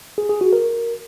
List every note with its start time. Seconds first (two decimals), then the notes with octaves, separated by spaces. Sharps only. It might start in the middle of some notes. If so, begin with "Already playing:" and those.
0.18 G#4
0.29 G#4
0.41 F#4
0.53 A#4